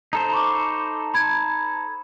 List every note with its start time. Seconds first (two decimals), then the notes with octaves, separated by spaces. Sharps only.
0.13 D#4 A4 C5
0.31 B5 C#6 D6
1.14 B5 G#6